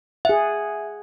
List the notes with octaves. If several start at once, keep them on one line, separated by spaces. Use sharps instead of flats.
G#4 E5 F#5